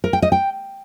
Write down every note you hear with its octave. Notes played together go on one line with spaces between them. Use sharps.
A#4
G5
D#5
G5